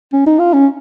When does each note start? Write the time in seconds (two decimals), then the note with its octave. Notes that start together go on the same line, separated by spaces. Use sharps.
0.13 C#4
0.27 D#4
0.39 F4
0.53 C#4